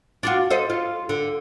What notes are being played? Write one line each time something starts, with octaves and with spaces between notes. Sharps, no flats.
D4 F4 F#4
A4 C5 D#5
F4
D3